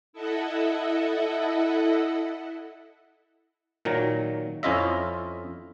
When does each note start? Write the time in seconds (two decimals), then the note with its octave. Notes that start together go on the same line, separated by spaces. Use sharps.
0.13 E4 A4 D#5 E5 F#5
3.85 A#2 D#3 F#3 A#5
4.63 F2 C#4 E4 F4 D#5 E5